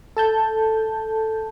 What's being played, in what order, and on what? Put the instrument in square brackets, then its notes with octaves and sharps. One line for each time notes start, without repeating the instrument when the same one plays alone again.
[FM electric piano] A4 A5 G6